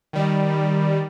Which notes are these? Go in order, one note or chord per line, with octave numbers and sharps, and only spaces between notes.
D#3 G3